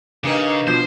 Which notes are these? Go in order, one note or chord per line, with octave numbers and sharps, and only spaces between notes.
C#3 A#3 D4 D#4 G4 B4
B2 F3 C5 G6